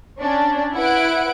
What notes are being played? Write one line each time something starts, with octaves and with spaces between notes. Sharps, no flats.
C#4 D4
E4 B4 F#5 D7